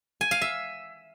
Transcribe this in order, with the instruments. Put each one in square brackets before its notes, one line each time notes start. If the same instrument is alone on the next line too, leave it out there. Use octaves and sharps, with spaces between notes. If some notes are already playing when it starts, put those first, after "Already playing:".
[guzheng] G#5
F5
E5